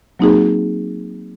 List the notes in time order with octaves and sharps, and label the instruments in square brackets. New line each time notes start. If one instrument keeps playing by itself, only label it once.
[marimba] F#3 A#3 C4 D#4 F#4 G#4